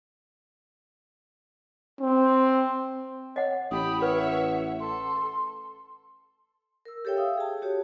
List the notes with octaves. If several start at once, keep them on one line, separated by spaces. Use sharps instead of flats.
C4
C#5 D#5 F#5
A1 G4 B5 D#6
B4 C#5 E5 F#5
A4 C6
A#4 E6
G4 A4 C#5 E5 G5
E5 F5 G5 D#6 E6
G#4 A5
F#4 G4 C#5